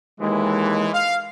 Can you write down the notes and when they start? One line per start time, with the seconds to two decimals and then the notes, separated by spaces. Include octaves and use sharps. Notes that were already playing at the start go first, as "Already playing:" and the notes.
0.20 D#2 E3 G#3
0.93 F5